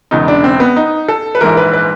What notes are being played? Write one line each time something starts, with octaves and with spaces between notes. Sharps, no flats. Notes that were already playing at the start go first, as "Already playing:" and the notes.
E1 E2 C#3 D#4
D4
C4
B3
D#4
A4
B4
A#1 G#2 E3 A#4
B4
B4